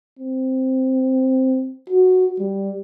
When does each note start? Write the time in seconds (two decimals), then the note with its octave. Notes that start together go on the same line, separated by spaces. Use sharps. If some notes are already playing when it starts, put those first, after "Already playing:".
0.19 C4
1.90 F#4
2.40 G3